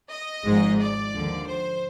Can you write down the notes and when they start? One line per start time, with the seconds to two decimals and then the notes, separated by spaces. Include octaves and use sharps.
0.10 D#5
0.44 G#1 G#2 F3 G#3
0.79 D5
1.12 D#2 D3 F3
1.48 C5